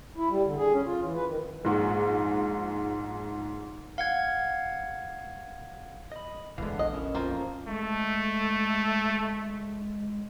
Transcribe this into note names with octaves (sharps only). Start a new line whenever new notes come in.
E4
G3
D3
G#4
C#4
F4
E3
B4
D#3
A#1 G#2
F5 F#5 G#6
D#5 B5
E1 D3 E3 G#3 B3 F5
A#1 D#5
C#4 E4 A#4
F2 A#3 F4 C5
G#3 A3